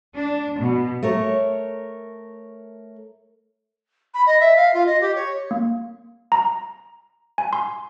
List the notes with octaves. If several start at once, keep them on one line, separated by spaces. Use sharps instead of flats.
D4
B2
A3 A#4 C#5
B5
D#5
E5
F5
F4
D#5
G4
C#5
A#3
A#5
G#5
C6